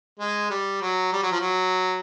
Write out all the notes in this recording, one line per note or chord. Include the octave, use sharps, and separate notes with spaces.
G#3
G3
F#3
G3
F#3
F3
F#3